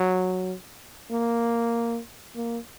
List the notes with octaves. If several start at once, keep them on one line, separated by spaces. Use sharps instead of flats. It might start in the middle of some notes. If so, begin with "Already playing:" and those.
Already playing: F#3
A#3
A#3